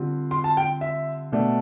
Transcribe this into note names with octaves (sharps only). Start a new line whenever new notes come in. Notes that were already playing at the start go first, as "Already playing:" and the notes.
Already playing: D3 G3 C4 F4
C6
A5
G5
E5
B2 A3 D4